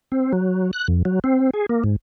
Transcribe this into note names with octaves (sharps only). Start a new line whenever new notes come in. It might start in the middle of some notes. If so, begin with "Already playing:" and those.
C4
F#3
F#6
F2
F#3
C4
G#4
A#3
G#2